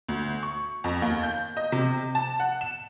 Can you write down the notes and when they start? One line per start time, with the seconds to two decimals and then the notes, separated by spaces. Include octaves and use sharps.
0.09 D2
0.43 C#6
0.84 F2
1.02 D#2
1.23 G6
1.57 D#5
1.72 C3
2.15 A5
2.40 F#5
2.61 E7